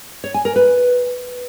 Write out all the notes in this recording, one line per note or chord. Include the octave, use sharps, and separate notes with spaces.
C#5
G#5
A#4
B4